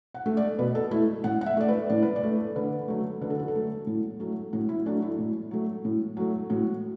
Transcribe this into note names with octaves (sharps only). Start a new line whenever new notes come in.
F#5
A3
D5
B2 B4
A4
A3 E4
A2 F#5
F#5
E5
A3 D5
B4
A2 D5
B4
D5
A3
D3 B4
F#3 A3
D3 B4
A4
F#4
A4
F#3 A3
A2
F#3 A3
A2 F#4
E4
F#3 A3 D4
E4
A2
F#3 A3
A2
F#3 A3
A2 F#4